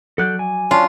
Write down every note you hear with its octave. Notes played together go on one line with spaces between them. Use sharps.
F#3 A4 D5 F#6 G6
G#5
C#4 D4 F4